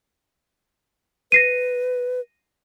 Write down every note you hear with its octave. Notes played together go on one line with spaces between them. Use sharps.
B4 A#6 C7 D#7